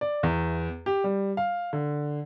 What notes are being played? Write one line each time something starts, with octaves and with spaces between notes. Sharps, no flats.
D5
E2
G4
G3
F5
D3